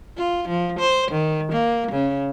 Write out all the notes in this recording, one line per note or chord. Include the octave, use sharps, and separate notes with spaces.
F4
F3
C5
D#3
A#3
C#3